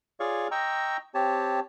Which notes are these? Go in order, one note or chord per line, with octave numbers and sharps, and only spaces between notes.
F4 G#4 C#5 D5 F5 C#6
D#5 G5 A#5 C#6 E6
C4 G4 C#5 A5